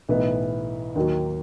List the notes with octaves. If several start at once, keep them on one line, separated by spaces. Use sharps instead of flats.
B1 A2 E3 B3
D#2 D#3 F#3